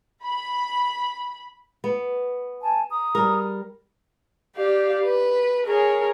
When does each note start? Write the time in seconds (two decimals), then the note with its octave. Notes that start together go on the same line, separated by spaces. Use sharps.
0.24 B5
1.84 B3
2.62 G#5 A5
2.89 A#5 D#6
3.15 G3 A#4
4.55 G4 D5 F5
5.05 B4
5.65 G#4 A#4 C#5